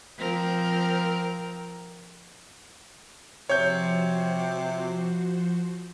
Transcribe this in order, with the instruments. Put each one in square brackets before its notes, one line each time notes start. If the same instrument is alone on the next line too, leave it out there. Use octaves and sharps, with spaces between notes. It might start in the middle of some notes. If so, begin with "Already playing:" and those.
[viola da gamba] F3 C4 A#4
[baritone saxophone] C3 [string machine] F3 F#4 C5 [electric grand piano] C#5 G6